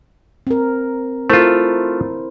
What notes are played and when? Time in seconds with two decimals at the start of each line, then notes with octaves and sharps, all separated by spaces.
0.47 C4 A#4
1.30 A3 E4 F4 A#4 C5